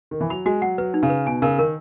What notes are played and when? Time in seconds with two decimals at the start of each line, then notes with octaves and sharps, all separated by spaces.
0.11 D#3
0.21 E3
0.30 F#3 B5
0.45 G#3 F#4
0.62 F#3 F#5
0.78 F#3 B4
0.94 D#4
1.03 C#3
1.10 B4
1.26 B2 G#5
1.42 C#3 A#4
1.58 D#3 A#4